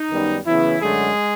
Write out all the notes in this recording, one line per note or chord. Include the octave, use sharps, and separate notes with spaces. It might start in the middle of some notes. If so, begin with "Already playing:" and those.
Already playing: D#4
F#2 D#3 G3 B3
C#3 E3 F#3 B3 E4
F#2 D3 F#3 G#3 A3 G#4